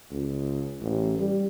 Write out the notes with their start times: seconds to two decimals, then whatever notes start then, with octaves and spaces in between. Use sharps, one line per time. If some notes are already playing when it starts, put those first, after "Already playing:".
0.11 C#2
0.81 A1
1.19 G3